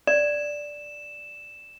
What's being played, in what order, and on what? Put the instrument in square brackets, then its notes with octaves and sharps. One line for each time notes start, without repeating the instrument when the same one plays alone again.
[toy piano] D5 [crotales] E7